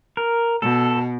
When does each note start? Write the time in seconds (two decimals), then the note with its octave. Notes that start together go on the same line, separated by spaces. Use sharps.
0.17 A#4
0.62 B2 A4